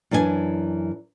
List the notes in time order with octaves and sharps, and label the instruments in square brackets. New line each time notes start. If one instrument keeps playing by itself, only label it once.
[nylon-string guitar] F#2 E3 D4 F#4 G#5